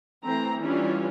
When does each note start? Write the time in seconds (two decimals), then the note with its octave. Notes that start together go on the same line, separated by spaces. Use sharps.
0.23 E3 A3 C4 A#5
0.60 E3 G3 C#4 D4 F4